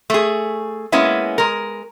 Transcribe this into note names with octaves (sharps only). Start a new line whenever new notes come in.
A3 G#4
G#3 A#3 B3 C#4 E4
G#3 A#4